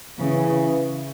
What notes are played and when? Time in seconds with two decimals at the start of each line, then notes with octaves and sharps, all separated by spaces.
0.18 C#3 E3